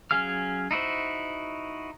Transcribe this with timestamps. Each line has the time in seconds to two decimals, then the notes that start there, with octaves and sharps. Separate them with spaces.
0.11 F#3 C#4 G#4 F5 F6
0.71 D#4 E4 F#4 C5